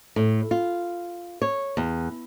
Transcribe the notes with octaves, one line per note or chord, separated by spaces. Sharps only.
A2
F4
C#5
E2